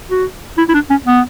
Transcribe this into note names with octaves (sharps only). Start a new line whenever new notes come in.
F#4
E4
E4
D4
C#4
B3